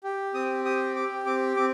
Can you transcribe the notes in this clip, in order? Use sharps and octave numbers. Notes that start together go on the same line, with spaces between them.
G4
C4 D#6
G4 D#6
G4 D6
C4 D6
C4 D6